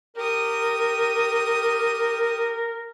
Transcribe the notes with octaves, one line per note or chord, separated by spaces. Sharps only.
G4 A#4 D#6